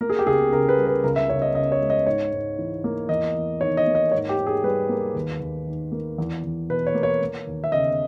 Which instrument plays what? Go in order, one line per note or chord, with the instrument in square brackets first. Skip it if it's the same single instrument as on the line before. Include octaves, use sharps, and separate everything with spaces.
[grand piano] A#3 A#4
G#4
G4
C#2 G#4
C#3 A#4
B4
G3
B4
C#2 A#4
E5
C#2 C#5
D#5
C#3 D#5
C#5
G#3
D#5
G#2 C#5
G#2
E3
A#3
E2 D#5
E2
D#3 C#5
D#5
A#3
D#5
G#2 C#5
G4
G#2
G#4
G3 B4
A#3
D#2
D#2
D#3
A#3
E2
E2
B2 B4
C#5
A#3
C#5
A#3
D#2
E5
C#3 D#5